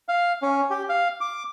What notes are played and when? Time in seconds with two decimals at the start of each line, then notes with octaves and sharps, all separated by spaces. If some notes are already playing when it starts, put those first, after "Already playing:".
0.08 F5
0.42 C#4
0.70 G4
0.89 F5
1.20 D6